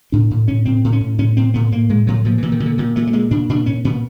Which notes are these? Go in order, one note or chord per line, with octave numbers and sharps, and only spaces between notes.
A2 D4
A2
A2 C#4
A2 C4
A2
C#4
A2
A2 C#4
A2 C4
A2 B3
A2 A#3
A2 G#3
A2 F#3
A#2 F3
A#2 E3
D#3
A#2
D3
A#2 D#3
A#2 A3
A3
A#2 G#3
A#2 D4
A#2 D4
A#2 C#4
A#2 B3